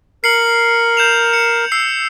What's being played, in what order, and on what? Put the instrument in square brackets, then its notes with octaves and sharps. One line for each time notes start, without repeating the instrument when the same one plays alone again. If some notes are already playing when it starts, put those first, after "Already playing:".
[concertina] A#4 [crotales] C7 C#7 F#7
[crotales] G6 E7 F7
C#7
E6 C7